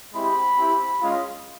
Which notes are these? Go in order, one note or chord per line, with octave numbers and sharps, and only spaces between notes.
G#3 C4 E4 G4 B5
C4 E4 G4
G#3 C#4 F4